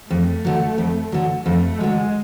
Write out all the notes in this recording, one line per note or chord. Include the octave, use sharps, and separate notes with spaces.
F2 A3
D3 F#3
F2
D3 F#3
F2 A3
D3 F#3 G#3